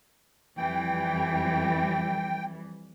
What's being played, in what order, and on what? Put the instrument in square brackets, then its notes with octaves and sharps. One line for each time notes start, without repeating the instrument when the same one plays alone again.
[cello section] F2 E3 G3 [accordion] G5